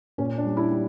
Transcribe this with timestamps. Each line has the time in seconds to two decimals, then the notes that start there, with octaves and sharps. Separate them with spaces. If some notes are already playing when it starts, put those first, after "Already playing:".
0.18 A#2 C#4
0.38 D4
0.45 G3
0.57 E4
0.71 G3